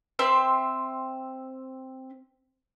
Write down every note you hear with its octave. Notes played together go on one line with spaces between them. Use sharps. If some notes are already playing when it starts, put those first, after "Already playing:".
C4 E5 C6